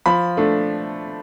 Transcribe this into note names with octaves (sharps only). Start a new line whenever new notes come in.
F3 B5
A3 D4